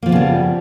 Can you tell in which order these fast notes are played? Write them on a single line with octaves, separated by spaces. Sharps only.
A#3 F3 B3 C#3 G3